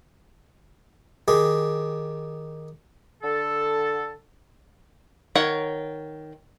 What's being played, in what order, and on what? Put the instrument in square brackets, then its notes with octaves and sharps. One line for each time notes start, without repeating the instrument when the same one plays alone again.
[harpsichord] D#3 G4 G#4
[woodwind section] D3 A4
[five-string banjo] D#3 A#4 C#5 F#5